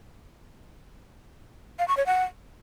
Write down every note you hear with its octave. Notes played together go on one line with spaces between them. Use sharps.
F5
C#6
C#5
F#5